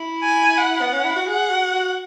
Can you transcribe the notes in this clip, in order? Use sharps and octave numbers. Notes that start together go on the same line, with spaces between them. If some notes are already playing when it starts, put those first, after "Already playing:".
Already playing: E4
G#5
F#5
B3
C#4
E4
F#4
G#4 F#5
F#4
F#4